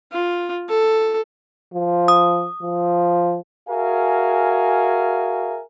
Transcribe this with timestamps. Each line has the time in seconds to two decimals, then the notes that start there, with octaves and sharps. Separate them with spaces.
0.12 F4
0.69 A4
1.74 F3
2.08 D#6
2.63 F3
3.68 F#4 G#4 A#4 E5 F5 G#5